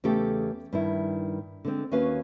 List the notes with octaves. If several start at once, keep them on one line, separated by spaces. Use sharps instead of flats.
E2 C#3 A3 G4 A4
G2 D#3 E4
D3 G#3 C4
D#2 C#4 F#4 B4 F5